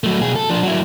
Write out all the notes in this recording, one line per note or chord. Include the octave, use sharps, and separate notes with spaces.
F#3 A3
B2 G#4
A4
F3 D4
F#3 E4